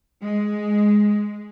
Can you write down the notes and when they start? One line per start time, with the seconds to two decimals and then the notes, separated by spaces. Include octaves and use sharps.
0.22 G#3